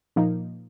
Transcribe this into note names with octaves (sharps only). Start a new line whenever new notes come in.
A#2 F3 A#3 D#4